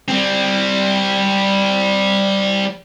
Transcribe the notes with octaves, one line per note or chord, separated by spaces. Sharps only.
G3 C4